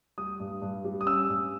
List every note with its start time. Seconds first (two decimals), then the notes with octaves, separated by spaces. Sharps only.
0.18 G3 D#6
0.40 G2
0.62 G2
0.84 G3
1.01 D#6
1.06 C#4 E6
1.29 G2